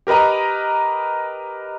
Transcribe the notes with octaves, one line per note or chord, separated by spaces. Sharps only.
G4 A#4 B4 D#5 A#5